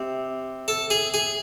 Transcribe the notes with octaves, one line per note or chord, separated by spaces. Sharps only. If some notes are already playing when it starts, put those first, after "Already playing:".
Already playing: C3
A4
G#4
G#4